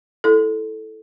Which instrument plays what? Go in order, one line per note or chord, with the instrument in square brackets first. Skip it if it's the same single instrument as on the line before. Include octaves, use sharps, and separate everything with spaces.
[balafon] E4 A4